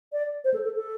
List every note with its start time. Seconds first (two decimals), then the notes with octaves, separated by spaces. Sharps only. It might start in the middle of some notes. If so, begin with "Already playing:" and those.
0.13 D5
0.44 C5
0.54 A4
0.64 A4
0.75 A4